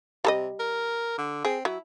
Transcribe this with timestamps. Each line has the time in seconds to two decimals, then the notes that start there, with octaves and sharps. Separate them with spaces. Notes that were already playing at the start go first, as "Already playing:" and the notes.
0.25 C3 G3 A4 D#5
0.60 A#4
1.18 D3
1.45 C4 G#4
1.65 F#3 E4